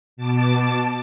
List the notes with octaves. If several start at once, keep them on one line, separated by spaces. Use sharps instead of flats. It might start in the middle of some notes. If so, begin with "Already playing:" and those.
B2 A5 D6